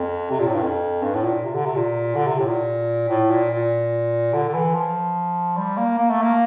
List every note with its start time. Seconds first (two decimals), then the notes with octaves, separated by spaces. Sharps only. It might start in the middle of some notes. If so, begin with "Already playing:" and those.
Already playing: F2
0.31 C3
0.40 A#2
0.47 A2
0.54 G2
0.63 F2
1.03 G2
1.14 A2
1.24 A#2
1.45 C3
1.55 D3
1.66 C3
1.75 A#2
2.15 D3
2.27 C3
2.39 A2
2.47 A#2
3.09 A2
3.31 A#2
3.51 A#2
4.33 D3
4.48 D3
4.54 E3
4.74 F3
5.57 G3
5.77 A#3
5.99 A#3
6.10 A3
6.22 A#3